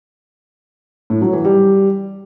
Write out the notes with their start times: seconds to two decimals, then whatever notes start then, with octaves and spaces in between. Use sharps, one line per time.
1.10 A2
1.22 F#3
1.33 E3
1.45 G3